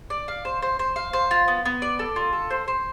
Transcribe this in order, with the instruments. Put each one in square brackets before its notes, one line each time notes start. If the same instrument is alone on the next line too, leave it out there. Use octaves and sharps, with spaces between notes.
[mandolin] D5
F5
C5
C5
C5
F5
C5
F4
B3
B3
D5
A4
F4
A4
C5
C5